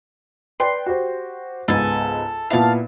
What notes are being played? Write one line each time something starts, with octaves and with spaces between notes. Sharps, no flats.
B4 D5 G5 C6
F#4 G4 C5
C#2 G#2 B3 A4 G#5
A#2 B3 E4 F5 A5